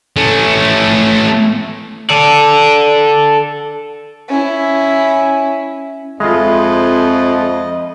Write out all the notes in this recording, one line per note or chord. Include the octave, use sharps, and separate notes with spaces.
A3 C#4
A4 D5
C#4 E4
F2 G#3 F4 D#5 E5 B5 C6